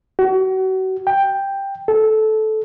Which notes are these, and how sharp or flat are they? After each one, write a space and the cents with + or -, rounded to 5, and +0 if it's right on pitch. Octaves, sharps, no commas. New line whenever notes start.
F#4 +35
G5 +5
A4 -15